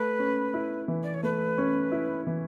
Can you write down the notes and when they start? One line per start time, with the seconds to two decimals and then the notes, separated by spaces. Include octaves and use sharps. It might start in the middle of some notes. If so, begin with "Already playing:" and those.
Already playing: A3 B4
0.19 C#4
0.54 E4
0.88 E3
1.03 D5
1.14 C#5
1.23 A3 B4
1.58 C#4
1.92 E4
2.27 E3